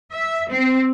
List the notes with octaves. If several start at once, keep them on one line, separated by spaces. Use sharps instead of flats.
E5
C4